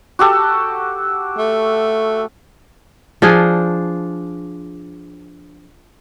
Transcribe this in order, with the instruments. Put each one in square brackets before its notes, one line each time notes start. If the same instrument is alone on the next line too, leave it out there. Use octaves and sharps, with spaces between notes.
[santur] F#4 G4 A4
[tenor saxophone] A3
[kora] F3 D4 G#4